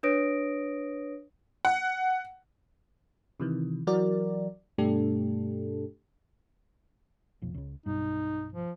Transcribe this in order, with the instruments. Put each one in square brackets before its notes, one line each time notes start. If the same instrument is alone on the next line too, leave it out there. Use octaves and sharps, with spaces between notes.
[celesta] D4 B4 C#5 D#6 A#6 D7
[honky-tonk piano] F#5
[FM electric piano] C3 D#3 E3
E3 F#3 F#4 A#4 D5
G2 B2 A3 D4 G4 A4
[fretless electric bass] F1 B1 F2
C#2 C#3
[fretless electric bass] B1 G2 [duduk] D#4
[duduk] F3